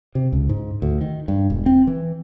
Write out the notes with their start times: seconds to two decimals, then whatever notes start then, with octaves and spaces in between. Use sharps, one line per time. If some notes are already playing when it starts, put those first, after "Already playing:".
0.15 C3
0.32 C#2
0.49 G#2
0.82 D2
1.01 D#3
1.28 G2
1.50 E1
1.66 C4
1.87 E3